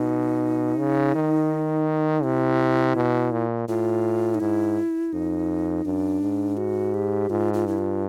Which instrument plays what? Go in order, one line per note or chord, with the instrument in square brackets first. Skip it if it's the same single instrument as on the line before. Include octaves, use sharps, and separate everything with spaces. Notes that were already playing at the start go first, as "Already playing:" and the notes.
Already playing: [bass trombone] B2 [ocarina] D#4
[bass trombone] C#3
D#3
[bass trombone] C3 [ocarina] E4
[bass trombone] B2
A#2
[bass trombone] A2 [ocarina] F4
[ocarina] D#4
[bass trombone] G#2 [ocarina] E4
[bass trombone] F2 [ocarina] D#4
[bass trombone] F#2 [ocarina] D4
[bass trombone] G#2
[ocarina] F#4
G4
[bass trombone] G#2 [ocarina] F4
[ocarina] F4
[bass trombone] G2 [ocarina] E4
[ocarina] F4